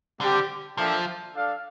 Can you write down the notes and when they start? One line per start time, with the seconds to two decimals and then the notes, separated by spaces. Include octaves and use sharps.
0.20 D3 G3 C4 G4 D5
0.78 F3 A#3 D4 A4 E5 G5
1.35 D4 A4 D5 F5